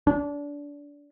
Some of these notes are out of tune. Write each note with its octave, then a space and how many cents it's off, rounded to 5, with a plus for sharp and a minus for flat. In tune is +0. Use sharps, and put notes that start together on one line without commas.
D4 -25